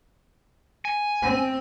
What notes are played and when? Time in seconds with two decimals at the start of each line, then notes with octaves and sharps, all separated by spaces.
0.85 G#5
1.22 C4